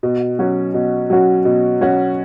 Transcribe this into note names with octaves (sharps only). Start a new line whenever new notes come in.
B2
F#3 C#4 F#4
B2
F#3 C#4 F#4
B2
F#3 C#4 F#4